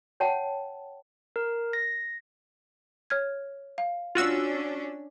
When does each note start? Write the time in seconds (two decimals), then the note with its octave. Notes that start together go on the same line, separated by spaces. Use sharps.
0.20 C#5 F#5 G5 A5
1.36 A#4
1.73 A#6
3.10 C#5 F6 G#6
3.78 F5
4.15 C#4 D4 F4 F#4 E6